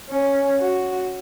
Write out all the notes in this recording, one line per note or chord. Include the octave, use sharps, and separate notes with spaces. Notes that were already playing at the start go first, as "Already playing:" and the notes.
C#4
F#4